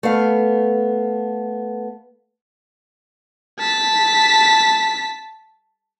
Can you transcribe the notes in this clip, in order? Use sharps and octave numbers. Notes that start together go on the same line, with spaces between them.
A3 B3 F5
A5 B6